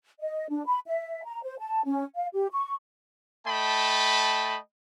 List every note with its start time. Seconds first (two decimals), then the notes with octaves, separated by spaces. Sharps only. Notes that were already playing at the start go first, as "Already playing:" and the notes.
0.20 D#5
0.50 D4
0.66 B5
0.86 E5
1.25 A#5
1.43 C5
1.59 A5
1.86 C#4
2.15 F5
2.33 G4
2.52 C#6
3.47 A3 D#5 G5 A5 B5